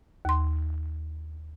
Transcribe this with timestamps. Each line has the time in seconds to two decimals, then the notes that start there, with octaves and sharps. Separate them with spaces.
0.25 D#2 C6